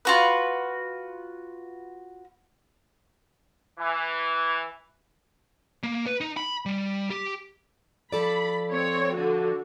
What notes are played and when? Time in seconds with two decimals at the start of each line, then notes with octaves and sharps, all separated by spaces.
0.05 F4 F#4 B4
3.78 E3
5.83 A#3
6.06 B4
6.21 D#4
6.37 B5
6.66 G3
7.10 G4
8.12 F3 A4 D5 B5
8.71 C4 C#5
9.14 D3 F#4